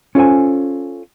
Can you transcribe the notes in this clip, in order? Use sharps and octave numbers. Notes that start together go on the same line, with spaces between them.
C#4 F4 A4 C5 G#5